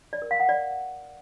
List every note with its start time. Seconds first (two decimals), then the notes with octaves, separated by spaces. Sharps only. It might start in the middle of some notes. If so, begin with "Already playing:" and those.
0.13 D5
0.22 A#4
0.31 F5
0.40 F#5
0.49 D5